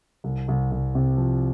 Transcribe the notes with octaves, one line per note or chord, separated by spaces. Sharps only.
C2
C2
C2
C3
F3